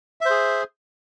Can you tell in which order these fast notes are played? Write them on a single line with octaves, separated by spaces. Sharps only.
E5 C5 G#4